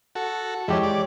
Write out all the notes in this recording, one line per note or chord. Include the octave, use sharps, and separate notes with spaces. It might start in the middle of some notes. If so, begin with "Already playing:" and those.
F#4 A4
F2 E3 G#3 G4 C#5
D5